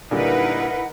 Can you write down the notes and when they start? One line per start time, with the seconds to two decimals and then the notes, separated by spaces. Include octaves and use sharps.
0.11 A#2 D3 G3 D#4 E4 A#4 B4 F#5